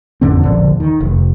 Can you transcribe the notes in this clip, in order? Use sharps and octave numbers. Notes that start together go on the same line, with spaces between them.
A1 F2 D3 C4
E1 A#1 D3
D#3
F1